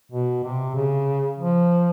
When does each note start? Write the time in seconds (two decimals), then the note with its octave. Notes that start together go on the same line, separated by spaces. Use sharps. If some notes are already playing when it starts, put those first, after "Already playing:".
0.12 B2
0.44 C3
0.75 C#3
1.38 F3